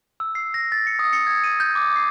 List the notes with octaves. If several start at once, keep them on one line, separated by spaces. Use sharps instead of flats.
E6
C7
A#6
A6
C#7
D#6
C#7
G#6
D#7
G6
D6
C7